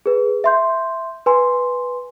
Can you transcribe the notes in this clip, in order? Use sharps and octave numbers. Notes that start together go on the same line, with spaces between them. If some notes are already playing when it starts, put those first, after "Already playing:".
G#4 B4
E5 C6 G6
B4 G#5 C6